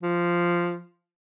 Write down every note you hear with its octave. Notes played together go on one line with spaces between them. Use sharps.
F3